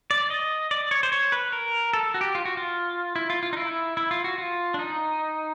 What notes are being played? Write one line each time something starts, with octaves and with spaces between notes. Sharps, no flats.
D5
D#5
D5
C#5
C5
C#5
B4
A#4
A4
F#4
G4
F4
F#4
F4
E4
F4
F4
D#4
E4
E4
F4
F#4
F4
D4
D#4